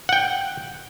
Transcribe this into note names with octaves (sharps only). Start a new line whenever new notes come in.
F#5 G5